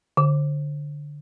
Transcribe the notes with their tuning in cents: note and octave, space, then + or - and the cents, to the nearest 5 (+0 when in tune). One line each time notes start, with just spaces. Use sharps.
D3 +0 D6 +0